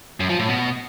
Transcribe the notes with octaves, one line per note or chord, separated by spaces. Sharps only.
F#2
F3
A2
B2